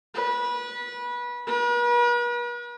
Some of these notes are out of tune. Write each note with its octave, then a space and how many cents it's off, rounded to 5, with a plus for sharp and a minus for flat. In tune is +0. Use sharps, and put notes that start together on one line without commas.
B4 -25
B4 -45